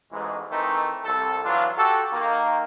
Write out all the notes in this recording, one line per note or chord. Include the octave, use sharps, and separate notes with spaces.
A1 G#2 E3 G#3
D#3 E3 A3 C4 D#4
C2 A4
E3 F#3 D4 F4
F#4 G4 A4
D#3 A#3